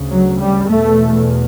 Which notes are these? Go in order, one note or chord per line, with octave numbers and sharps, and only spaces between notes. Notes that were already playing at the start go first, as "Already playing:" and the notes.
Already playing: D2 C#3
F#3
G3
E2 B2 A3